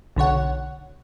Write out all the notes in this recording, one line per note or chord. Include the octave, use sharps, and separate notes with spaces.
B1 D3 C#5 F#5